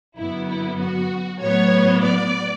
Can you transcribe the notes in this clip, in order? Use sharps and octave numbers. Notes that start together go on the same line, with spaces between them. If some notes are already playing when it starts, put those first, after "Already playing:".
F#2 D3 F#3 B3 E4
E4
F#4
A2 F#3 B3 C#5
D5